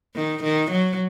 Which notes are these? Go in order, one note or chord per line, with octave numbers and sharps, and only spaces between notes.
D#3
D#3
F#3